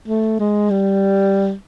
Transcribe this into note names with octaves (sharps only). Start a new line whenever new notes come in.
A3
G#3
G3